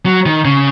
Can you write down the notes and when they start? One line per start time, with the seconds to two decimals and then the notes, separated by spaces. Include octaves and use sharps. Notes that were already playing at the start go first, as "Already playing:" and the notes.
0.06 F#3
0.26 D#3
0.45 C#3